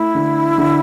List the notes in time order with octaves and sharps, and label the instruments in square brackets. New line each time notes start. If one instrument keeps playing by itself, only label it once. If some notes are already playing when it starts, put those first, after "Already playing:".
Already playing: [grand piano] A3 [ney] E4
[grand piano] D3
D3